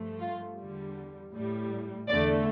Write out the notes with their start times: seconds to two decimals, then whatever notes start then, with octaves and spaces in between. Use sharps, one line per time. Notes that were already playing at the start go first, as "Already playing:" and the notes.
Already playing: G2 F3 A3
0.19 F4
0.56 E2 D3 G3
1.32 A2 G3
2.07 E2 D3 A3 D5